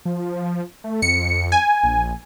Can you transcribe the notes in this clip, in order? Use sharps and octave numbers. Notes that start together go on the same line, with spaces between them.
F3
A3
F2 C#7
G#5
A#1